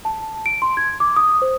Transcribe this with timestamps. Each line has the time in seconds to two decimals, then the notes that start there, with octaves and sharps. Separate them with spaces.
0.05 A5
0.46 D7
0.62 C6
0.77 G#6
1.00 D6
1.16 D#6
1.42 C5